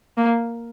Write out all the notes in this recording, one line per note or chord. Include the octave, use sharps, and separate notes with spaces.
A#3